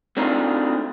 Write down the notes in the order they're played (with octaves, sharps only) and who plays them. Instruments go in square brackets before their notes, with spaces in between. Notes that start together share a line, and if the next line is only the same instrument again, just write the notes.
[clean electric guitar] A3 C4 D4 D#4 F4 A#4